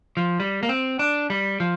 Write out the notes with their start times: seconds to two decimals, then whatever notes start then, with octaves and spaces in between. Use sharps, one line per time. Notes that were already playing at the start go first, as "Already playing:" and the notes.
0.17 F3
0.40 G3
0.63 A#3
0.69 C4
0.99 D4
1.30 G3
1.60 F3